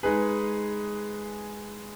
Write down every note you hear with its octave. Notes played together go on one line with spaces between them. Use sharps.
G#3 D#4 G#4 B4